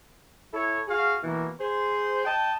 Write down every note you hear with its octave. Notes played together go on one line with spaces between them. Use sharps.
E4 A4 C#5
F#4 G#4 F5
B2 E3 A#3
G#4 C5
D#5 G5 A5